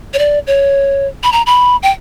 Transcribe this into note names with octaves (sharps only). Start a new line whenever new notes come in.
C#5
D5
C#5
B5
A#5
B5
G5